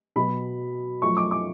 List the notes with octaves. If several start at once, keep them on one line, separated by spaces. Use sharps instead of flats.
B2 F#3 B3 B5
F#2 F3 A3 C#6
D6
D6